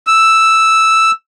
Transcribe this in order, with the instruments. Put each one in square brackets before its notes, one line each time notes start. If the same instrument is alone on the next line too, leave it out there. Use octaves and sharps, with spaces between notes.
[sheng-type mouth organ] E6